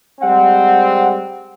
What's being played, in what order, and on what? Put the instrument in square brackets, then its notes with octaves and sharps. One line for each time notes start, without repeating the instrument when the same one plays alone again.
[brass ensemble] G3 G#3 C4 [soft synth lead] F#5